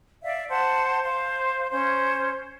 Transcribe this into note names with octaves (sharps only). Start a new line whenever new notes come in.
D5 E5 F5
C5 F#5 A5
C5 F5
C#4 C5